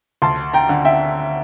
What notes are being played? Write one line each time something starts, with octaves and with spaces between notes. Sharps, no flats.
D2 A5 C6
G5 A#5
D3
E5 G5